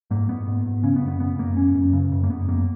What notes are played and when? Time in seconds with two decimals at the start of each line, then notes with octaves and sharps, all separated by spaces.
0.11 G#2 A#3
0.29 G#2 B3
0.47 G#2
0.65 G#2
0.83 C#3 C#4
0.96 B3
1.02 F#2
1.08 B3
1.20 C#3 B3
1.39 F#2 A#3
1.57 F#2 C#4
1.75 F#2
1.93 C#3
2.12 F#2
2.24 A#3
2.30 F#2 B3
2.48 F#2 A#3